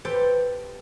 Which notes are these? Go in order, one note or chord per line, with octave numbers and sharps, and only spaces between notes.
G4 A4 B4 C5 G5